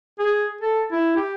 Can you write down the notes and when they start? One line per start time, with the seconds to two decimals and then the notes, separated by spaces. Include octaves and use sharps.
0.19 G#4
0.61 A4
0.92 E4
1.16 G4